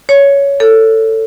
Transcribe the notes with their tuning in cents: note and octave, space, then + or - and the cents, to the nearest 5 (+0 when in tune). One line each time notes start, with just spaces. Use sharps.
C#5 +15
A4 +20